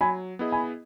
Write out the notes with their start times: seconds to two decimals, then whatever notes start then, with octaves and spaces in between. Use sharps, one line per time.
0.01 F#3 G#5 B5
0.39 B3 E4 G#4 D#5
0.52 G#5 B5